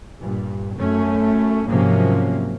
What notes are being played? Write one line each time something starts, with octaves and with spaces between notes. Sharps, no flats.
G2 A#2
F#2 A3 C#4
G#2 C3 F3 F#3 A#3 C#4